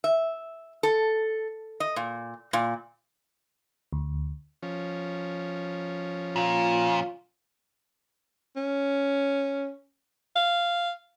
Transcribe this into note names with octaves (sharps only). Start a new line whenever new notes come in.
E5
A4
D#5
A#2
A#2
D2
F3 C#4
A#2 F4
C#4
F5